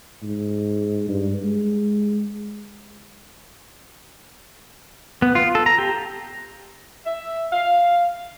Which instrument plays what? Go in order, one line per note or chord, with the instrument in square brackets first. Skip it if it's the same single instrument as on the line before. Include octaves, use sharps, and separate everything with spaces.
[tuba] G#2
G2
G#3
[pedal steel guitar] B3
F4
A4
A#5
G4
[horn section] E5
F5